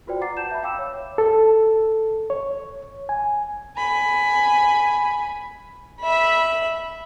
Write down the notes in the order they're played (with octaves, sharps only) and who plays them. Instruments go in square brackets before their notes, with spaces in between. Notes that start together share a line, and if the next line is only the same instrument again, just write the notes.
[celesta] F4 F#4 B4 C5 D5 G5
F#5 A#5 D6 A6 C7
A5 G6 E7
E5 B5
F5 G5 D6 E6 E7
C#5
[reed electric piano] A4
C#5
G#5
[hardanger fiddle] G#5 B5
[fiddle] E5 B5